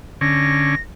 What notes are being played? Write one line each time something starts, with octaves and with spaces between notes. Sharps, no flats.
D3 C#4 A#6